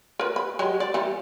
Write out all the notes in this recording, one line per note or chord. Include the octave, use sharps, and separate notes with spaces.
A#4 B4
B5
F#3 G#3 G4
D5
E3 G3